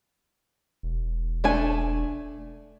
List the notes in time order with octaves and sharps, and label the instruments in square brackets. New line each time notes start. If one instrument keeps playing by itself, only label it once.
[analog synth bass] E1
[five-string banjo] A3 D4 G#5